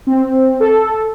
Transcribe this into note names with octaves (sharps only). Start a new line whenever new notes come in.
C4
A4